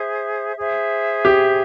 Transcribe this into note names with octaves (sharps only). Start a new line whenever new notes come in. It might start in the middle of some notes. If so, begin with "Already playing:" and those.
Already playing: G#4 C5 E5
G#4 C5 E5
G4